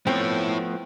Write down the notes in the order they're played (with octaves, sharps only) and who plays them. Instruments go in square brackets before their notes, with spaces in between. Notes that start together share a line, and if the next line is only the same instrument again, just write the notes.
[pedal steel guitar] F3 A3 B3 [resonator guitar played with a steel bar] C4 [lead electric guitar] E4 C#5